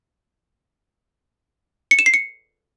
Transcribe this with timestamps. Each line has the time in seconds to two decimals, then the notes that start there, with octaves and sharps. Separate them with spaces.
1.91 C#7
1.99 E7
2.06 C7
2.14 C#7